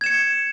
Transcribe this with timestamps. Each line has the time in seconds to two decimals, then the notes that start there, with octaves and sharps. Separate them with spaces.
0.01 G#6
0.04 E7
0.06 C#7